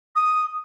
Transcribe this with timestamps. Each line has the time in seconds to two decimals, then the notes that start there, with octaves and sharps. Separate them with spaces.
0.15 D#6